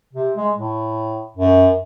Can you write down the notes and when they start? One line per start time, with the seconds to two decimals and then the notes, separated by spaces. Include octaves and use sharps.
0.13 C3
0.37 G#3
0.55 A2
1.37 F#2